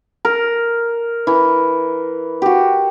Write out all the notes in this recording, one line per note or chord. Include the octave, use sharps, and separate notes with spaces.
A#4
E3
F#4 G4